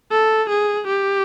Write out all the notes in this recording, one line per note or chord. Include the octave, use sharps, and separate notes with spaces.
A4
G#4
G4